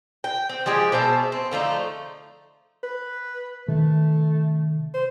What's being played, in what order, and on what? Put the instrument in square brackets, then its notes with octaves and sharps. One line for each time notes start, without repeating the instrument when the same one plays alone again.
[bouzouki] G5
C4
F3 G#3 G4 G#4
B2 C5 E5 A5
C4
D3 F3 A3 D#4
[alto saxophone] B4
[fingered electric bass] C3 D#3 [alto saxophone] A3
[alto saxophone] C5